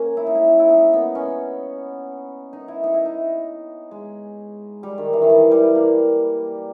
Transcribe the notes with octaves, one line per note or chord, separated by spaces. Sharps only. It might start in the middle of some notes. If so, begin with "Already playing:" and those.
Already playing: A#3 C#4
E4
D#4
E4
E4
D#4
B3
C#4
D#4
E4
D#4
E4
D#4
G#3
G3
D#3
E3
D#3
E3
G3
A#3